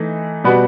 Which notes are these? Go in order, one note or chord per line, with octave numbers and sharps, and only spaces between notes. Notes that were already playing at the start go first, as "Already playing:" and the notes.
Already playing: E3 A3 D#4
B2 G3 B3 F#4 B4